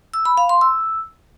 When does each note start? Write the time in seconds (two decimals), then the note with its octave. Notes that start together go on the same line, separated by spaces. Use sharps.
0.14 E6
0.25 B5
0.37 F5
0.49 C6
0.61 E6